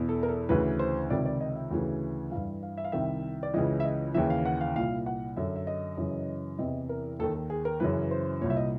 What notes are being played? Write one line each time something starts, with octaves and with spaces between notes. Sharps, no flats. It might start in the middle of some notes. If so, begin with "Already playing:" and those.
Already playing: E2 B2
A4
A#4
A4
D2 C#3 E3 B4
C5
C#2 C3 D#3 D5
D5
D#5
E5
D2 C#3 E3
G2 E3 F5
F5
E5
F5
C2 C3 D#3 E5
D5
C#2 C#3 E3 D#5
E5
D#5
D#2 C#3 E3 E5
F5
F#5
F5
C2 A#2 F5
F#5
F#2 D3 E5
E5
D#5
F#2 C#3 E3
E2 C3 E3 D#5
A#4
D#2 D#3 A4
A4
G#4
A#4
F#2 C#3 E3 B4
C5
C2 A#2 C#5
E5
D#5